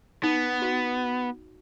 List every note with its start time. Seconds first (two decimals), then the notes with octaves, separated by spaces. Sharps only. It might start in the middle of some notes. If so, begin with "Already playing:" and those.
0.23 B3 D#4
0.62 F#4